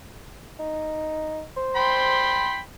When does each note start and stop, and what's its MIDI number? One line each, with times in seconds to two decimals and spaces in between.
0.59 1.44 63
1.57 2.41 72
1.76 2.59 79
1.76 2.59 83
1.76 2.59 84